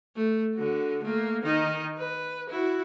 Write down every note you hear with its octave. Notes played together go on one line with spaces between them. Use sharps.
A3
D3 F#4
A3 A#3
D#3 D#4
B4
E4 F#4